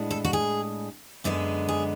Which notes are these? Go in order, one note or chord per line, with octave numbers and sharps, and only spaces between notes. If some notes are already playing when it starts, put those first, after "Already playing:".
Already playing: A2 G#3 B3 D4
A4
F#4
G#4
F#2 D3 G#3 B3
G#4